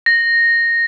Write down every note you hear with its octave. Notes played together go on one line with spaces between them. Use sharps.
A#6